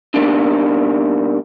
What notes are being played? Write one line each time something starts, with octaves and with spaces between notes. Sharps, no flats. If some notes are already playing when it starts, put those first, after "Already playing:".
B2 G3 G#3 A#3 D4 D#4